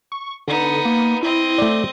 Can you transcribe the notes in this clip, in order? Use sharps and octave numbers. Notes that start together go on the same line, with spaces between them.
C#6
D3 B3 D#4
A#3
C4 E4 D#5
A3 D5